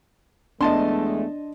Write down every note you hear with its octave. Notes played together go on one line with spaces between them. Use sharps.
E2 G#3 A3 B3 D4 D#5 A5 C6